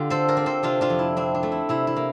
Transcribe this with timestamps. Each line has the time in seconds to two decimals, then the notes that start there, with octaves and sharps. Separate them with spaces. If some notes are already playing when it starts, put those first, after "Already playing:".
Already playing: D3 F4 G4
0.10 C4 A4 C5
0.28 A#4 D5
0.37 C4
0.46 A4 C5
0.63 C3 D4 F4
0.81 D4 F4
0.90 F2
0.99 E4
1.17 C4 D4
1.35 D4
1.43 A3
1.52 E4
1.69 C3 E4
1.87 E4
1.96 A#3